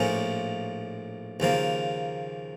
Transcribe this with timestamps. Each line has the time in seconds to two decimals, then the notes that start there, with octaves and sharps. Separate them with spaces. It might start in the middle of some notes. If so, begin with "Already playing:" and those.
Already playing: A#1 A2 F3 A#3 C#4
1.40 D#2 C#3 F3 A#3